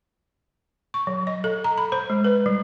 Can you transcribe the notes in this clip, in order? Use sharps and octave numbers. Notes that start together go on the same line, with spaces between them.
C#6
F#3
D#5
A4
A#5
B5
C5
G#3
B4
G3